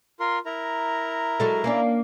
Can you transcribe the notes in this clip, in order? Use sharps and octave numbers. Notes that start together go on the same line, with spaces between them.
F4 A#4 C6
E4 A#4 A#5
F#3 G#3 A4
A#3 C#4 D4